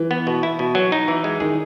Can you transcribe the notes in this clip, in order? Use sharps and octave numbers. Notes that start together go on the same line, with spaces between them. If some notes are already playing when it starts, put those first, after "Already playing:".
Already playing: E3
B3
B2
E4
B2
F#3
D#4
E3
G#3
D#3 G#4